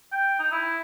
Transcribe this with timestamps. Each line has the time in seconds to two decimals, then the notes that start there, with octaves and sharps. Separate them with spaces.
0.12 G5
0.39 D#4
0.52 E4